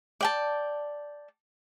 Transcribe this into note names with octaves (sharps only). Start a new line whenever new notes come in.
D5 G5 A5